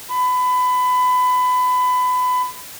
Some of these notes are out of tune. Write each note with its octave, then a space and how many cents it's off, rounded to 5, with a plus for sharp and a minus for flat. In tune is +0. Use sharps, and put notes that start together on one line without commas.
B5 +25